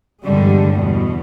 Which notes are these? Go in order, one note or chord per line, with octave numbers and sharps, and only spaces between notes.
E2 G2 D3 G3 G#3
E2 B2